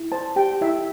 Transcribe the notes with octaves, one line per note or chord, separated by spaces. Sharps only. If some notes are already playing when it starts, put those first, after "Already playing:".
Already playing: E4
C5 A5
G4 G5
E4 E5